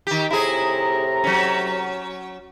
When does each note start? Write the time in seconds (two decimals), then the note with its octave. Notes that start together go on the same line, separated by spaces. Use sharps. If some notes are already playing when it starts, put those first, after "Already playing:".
0.07 D#3 G4
0.31 A2 C3 E4 G#4 A#5
1.24 F#3 C#4